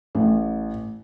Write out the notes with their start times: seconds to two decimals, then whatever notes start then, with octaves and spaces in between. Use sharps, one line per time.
0.15 A1